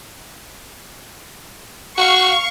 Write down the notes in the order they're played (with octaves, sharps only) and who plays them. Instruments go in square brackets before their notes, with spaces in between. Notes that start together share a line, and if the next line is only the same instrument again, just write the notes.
[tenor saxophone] F#4 [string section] F5 C#6